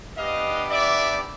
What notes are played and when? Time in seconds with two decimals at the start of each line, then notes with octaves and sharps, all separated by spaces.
0.16 B3 D4 G4 D#5 F5
0.70 D5 E5